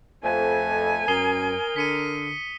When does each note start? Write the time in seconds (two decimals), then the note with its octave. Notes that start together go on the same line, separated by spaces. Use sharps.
0.24 F2 A3 G#5
1.08 F#2 A#4 D#6 C7 G7
1.76 D3 B6 C#7 D#7